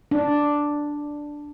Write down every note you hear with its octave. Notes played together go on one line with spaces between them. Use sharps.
D4